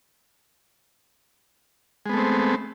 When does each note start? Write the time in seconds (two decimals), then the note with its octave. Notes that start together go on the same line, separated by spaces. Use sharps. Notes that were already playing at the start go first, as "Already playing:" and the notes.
2.06 G#3
2.09 B3
2.13 A3
2.17 C4